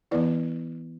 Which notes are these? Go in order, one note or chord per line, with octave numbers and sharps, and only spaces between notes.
E3 B3 E4 B4 D5